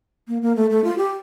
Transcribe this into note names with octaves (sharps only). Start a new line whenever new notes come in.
A#3
A#3
A3
A3
F4
G4